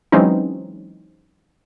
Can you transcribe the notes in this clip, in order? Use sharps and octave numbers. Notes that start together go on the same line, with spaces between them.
E3 F#3 G#3 C4 C#4 D#4